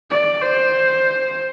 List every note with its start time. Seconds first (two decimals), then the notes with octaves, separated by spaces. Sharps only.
0.10 D5
0.42 C5